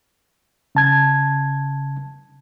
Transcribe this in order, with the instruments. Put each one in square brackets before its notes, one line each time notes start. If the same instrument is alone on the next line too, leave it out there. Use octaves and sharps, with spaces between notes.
[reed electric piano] C#3 A5 G#6